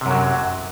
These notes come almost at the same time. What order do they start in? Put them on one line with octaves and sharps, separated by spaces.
C3 F#2 F#3